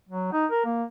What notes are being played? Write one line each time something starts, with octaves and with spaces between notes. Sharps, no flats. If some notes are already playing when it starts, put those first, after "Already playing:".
F#3
D#4
A#4
A#3